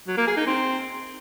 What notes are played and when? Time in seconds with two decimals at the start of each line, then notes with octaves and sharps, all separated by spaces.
0.07 F#3
0.17 A#3
0.27 G#4
0.37 D#4
0.47 C4